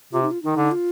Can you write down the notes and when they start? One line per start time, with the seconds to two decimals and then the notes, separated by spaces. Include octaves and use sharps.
0.12 C3 F4
0.22 D#4
0.31 F4
0.43 D#3 D#4
0.57 D3
0.72 F4